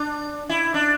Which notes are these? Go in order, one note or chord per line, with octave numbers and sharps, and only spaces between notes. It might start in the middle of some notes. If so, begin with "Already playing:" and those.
Already playing: D4
E4
D4